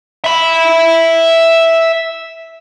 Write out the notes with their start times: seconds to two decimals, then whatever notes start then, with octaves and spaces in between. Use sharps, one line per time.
0.24 E5 B5